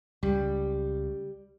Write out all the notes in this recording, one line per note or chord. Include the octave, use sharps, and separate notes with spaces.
C#2 G3